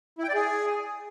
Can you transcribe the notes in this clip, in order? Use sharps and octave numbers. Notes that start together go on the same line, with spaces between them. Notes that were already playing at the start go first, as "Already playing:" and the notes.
E4
G5
D5
G#4